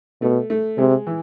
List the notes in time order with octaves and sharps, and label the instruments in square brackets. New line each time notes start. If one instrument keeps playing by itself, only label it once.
[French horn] B2 [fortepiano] A3
[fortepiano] A3
[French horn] C3 [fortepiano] G#3
[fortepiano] E3